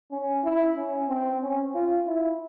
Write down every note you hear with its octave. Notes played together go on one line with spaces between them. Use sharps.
C#4
E4
C#4
C4
C#4
F4
E4